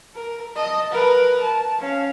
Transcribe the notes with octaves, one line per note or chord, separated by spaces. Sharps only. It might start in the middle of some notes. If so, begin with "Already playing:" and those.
A#4
D#5 A5
A#4 B4
A5
C#4 F5